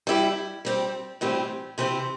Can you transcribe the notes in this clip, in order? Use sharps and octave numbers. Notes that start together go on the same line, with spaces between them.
G3 E4 G4
G3 C4 G4
A2 E3 G3 C4 G4
C3 E3 C4 G4